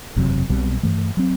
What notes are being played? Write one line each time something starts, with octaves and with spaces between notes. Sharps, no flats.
F#1 E2 C3 F#3
B1 B2 G3 C4
G2 E3 A3
F#3 C4